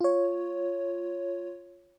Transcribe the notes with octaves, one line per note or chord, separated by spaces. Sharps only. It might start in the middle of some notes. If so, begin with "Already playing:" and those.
F4 C#5